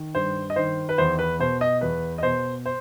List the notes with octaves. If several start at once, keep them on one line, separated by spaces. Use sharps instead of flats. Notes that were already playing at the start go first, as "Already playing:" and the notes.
Already playing: D#3
G2 C5
D#5
D#3 C5
B4
E2 C5
B4
B2 C5
D#5
E2 B4
D#5
B2 C5
C5